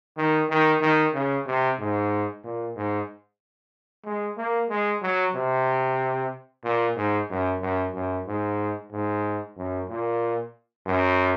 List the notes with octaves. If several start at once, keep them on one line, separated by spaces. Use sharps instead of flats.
D#3
D#3
D#3
C#3
C3
G#2
A#2
G#2
G#3
A#3
G#3
F#3
C3
A#2
G#2
F#2
F#2
F#2
G#2
G#2
F#2
A#2
F#2